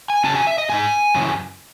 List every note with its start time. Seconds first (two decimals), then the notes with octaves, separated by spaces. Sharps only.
0.10 G#5
0.24 C#3 F#3 C#4 A5
0.35 G#5
0.47 E5
0.58 D#5
0.69 G#2 E3 G#3 D#4 G#5
1.15 F#2 C#3 E3